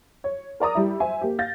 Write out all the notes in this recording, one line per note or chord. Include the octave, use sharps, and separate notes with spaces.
C#5
A#4 D5 A#5 D#6
G3 E4
C5 E5 G#5
A#3 G4
F5 G6 A6 A#6